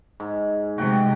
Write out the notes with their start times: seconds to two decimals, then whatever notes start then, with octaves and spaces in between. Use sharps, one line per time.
0.20 G#2
0.78 C3 G#3 F#4 G5